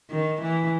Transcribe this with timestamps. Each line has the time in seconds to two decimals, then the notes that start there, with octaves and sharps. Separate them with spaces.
0.11 D#3
0.42 E3